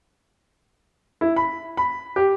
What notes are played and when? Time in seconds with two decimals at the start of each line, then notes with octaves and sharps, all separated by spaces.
1.21 E4
1.36 B5
1.77 B5
2.16 G4